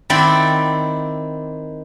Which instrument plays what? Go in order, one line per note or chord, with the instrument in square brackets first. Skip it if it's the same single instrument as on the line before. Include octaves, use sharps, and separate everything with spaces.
[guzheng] D#3 C4 E4 D5 F#5 B5